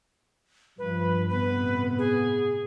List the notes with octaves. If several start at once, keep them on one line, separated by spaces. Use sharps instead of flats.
G2 F3 B4
A2 C3 B3 B4
G#4